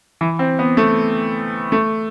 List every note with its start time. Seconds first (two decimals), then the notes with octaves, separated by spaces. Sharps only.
0.21 E3
0.39 C4
0.59 B3
0.77 A3
1.72 A3